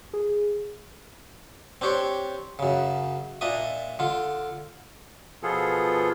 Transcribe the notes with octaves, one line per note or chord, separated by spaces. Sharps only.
G#4
C4 D4 G4 C5 C#5
F#2 C#3
A#2 D4 D#5 E5 D#6
D3 F4
B2 F3 B3 F4 G#4 A4